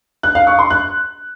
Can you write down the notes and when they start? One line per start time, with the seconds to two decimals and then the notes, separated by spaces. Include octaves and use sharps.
0.23 F#6
0.35 F5
0.47 C#6
0.59 C6
0.70 F#6